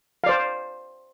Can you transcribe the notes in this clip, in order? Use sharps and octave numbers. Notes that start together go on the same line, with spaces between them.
C5 D5 F5